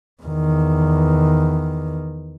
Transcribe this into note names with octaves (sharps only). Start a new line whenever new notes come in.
E2 D#3